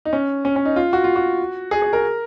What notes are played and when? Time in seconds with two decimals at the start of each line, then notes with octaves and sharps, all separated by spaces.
0.05 D#4
0.13 C#4
0.45 C#4
0.56 C#4
0.65 D#4
0.76 F4
0.93 F#4
1.04 F4
1.16 F#4
1.71 G#4
1.82 G#4
1.93 A#4